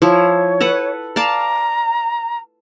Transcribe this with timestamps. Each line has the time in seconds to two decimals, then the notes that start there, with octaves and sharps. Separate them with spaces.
0.02 F3 E4 C#5
0.60 A4 B4 F#5
1.16 D5 F5 A5 A#5